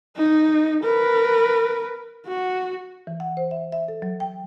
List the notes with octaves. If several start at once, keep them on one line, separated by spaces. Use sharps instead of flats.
D#4
A#4 B4
F#4
E3
F#5
C5
E5
E5
A4
F#3
G5